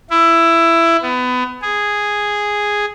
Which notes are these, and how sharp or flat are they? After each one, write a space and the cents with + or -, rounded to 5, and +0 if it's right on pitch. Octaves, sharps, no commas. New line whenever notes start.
E4 +15
B3 +25
G#4 -5